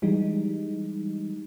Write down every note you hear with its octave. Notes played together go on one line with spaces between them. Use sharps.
E3 G3 G#3 D#4